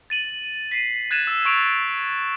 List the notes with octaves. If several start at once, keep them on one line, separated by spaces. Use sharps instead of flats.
A6 D#7 F#7
B6 C7 D#7
F#6 G#6 A6 D#7 E7
E6
C#6 D7 F7